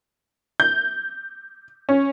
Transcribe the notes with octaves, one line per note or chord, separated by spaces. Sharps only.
G6
C#4